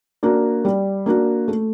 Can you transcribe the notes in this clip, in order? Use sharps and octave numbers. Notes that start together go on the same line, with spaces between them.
A#3 D4 F#4
G3
A#3 D4 F#4
A3